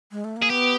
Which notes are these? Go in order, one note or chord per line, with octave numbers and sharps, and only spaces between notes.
G#3
A3
A#3
G#4
B3 G4